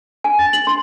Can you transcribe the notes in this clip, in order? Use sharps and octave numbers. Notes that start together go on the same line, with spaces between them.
G#5
A6
F#7
C6